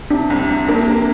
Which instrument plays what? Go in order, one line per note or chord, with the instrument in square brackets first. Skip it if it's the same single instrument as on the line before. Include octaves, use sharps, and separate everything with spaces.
[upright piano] C3 [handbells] D4
[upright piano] C2
C3
[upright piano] A#3 [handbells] D4
[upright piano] A#3